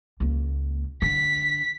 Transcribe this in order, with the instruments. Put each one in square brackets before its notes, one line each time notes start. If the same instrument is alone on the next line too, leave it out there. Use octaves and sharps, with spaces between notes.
[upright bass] C#2 A#3
[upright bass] D3 [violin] B6